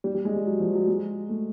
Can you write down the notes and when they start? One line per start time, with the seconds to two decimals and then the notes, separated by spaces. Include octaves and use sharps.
0.04 G3
0.15 G3
0.25 G#3
0.36 G3
0.46 F#3
0.60 F3
0.74 F#3
0.88 G#3
1.29 A3